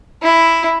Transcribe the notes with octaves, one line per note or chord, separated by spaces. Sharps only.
E4